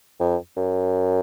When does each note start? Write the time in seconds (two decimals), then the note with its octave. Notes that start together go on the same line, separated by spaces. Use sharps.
0.20 F2
0.57 F#2